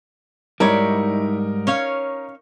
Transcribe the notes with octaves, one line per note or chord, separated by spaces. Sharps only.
G#2 G3 D#4 E4 A#4 C#5 D5
C#4 C#5 F5